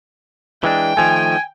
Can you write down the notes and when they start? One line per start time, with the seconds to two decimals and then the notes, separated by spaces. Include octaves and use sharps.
0.64 E3 G#3 D4 G5
0.97 D#3 F3 A3 G#5